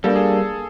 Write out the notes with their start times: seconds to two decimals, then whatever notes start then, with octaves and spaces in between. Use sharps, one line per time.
0.04 G3 A#3 D4 A4
0.16 G#4